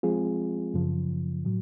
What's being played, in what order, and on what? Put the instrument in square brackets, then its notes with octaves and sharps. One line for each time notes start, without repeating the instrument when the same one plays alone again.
[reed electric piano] F3 G#3 C4 F4 G#4
F#2 C#3 F3
A2 F#3